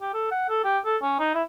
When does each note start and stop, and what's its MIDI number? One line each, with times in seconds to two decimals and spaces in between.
0.01 0.10 67
0.14 0.29 69
0.31 0.48 78
0.49 0.60 69
0.64 0.78 67
0.85 0.97 69
1.02 1.19 61
1.19 1.31 63
1.34 1.42 64